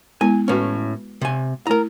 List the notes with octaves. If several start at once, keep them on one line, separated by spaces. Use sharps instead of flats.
G#3 B3 E4 G#5
A2 C#4 F#4 B4
C3 G#5
A3 E4 A#4 A#5